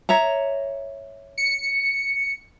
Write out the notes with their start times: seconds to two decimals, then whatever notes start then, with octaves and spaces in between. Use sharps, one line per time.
0.09 C#5 E5 A#5
1.38 C#7